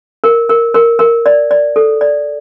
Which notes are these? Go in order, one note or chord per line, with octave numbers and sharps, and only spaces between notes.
A#4
A#4
A#4
A#4
D5
D5
A4
D5